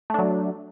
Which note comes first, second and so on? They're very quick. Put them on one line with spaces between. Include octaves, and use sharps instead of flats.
A3 D4 F#3